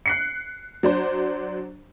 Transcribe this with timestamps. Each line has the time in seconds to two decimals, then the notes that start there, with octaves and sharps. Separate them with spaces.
0.06 F#6 C7 C#7
0.83 F#3 D4 C5